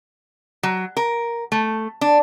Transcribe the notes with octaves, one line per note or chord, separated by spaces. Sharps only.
F#3
A#4
A3
D4